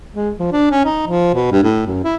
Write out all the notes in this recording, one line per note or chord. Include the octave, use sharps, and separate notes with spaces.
G#3
F3
D4
C#4
D#4
F3
B2
G2
A2
F#2
E4